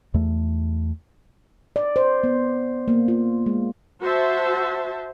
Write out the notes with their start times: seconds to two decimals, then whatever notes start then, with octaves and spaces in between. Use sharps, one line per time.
0.14 E2 A3
1.76 D5
1.96 C5
2.24 B3
2.88 A#3
3.08 F4
3.46 G#3
4.03 F#4 C5 E5 A5